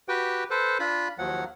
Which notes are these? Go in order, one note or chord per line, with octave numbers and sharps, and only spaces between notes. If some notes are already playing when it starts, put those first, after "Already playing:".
F#4 G4 B4 G5
A4 B4 C5
D4 F4 B5
D#2 F3 F#3 F#5